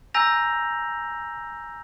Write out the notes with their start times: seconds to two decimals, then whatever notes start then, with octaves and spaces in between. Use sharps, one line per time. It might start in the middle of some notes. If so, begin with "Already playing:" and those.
0.14 G#5 A#5 E6 G6 A#6 F7